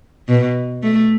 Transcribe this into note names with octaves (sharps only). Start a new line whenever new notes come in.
B2
A3